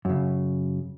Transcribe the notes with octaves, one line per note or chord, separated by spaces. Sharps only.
F#2 C#3